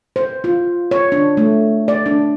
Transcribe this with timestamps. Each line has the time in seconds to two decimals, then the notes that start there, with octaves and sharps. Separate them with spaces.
0.16 C5
0.44 F4
0.91 C#5
1.12 D4
1.37 A3
1.88 D5
2.06 D4